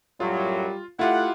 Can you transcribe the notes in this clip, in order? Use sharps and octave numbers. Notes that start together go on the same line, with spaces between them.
F#2 A2 F#3 G3 F4
A3 E4 F4 G4 F#5